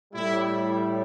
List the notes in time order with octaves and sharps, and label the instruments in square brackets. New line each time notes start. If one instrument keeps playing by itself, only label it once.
[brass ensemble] A2 G3 E4